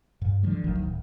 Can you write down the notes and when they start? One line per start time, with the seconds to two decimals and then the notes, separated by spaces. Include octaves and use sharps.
0.21 G2
0.43 D3 D#3 F3 G3
0.64 G#1 D2 D#3 F#3
0.79 D1